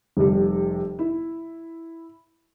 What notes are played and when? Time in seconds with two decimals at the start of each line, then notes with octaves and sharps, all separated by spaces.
0.17 F1 C3 G3
0.99 E4